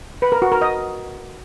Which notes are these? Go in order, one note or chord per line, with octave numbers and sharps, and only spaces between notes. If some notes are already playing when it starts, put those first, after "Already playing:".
B4
A#4
F#4
A#4
D#5